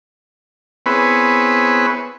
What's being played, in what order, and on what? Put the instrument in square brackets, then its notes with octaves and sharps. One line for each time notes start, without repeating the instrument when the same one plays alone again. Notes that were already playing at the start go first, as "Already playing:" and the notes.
[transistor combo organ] B3 C4 E4 G#4 B4 C#5